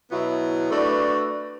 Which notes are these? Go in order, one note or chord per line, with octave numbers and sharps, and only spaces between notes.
B2 F#3 B3 E4
A3 D4 F#4 B4 D5